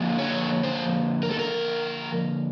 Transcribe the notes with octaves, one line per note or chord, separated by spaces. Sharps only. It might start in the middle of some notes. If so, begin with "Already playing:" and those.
Already playing: D3 F3 A#3
C#5
C5
A#4
A4
A#4